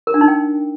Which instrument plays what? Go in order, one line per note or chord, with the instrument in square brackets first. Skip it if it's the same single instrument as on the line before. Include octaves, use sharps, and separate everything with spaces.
[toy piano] A#4
D4
D#4
G5